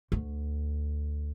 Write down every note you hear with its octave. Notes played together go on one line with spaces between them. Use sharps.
D2